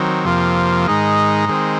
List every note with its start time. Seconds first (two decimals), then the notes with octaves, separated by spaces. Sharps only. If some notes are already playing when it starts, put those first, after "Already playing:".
Already playing: D#3 F#3 C4
0.25 F2 C3 F3 A#3 F4
0.87 G#2 D#3 G#3 D#4
1.49 D#3 G#3 C4